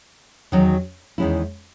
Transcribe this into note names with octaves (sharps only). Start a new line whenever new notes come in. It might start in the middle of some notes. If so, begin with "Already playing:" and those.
E2 D#3 F#3 C#4 F#4
E2 D#3 G#3 C#4 E4